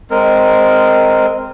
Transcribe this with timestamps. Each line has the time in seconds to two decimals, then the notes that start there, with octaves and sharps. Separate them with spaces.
0.10 G#3 C4 A#4